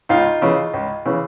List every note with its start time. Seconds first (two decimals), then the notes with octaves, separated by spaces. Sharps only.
0.09 C#2 D#4 F4
0.41 C#3 E3
0.73 C#2
1.05 C#3 E3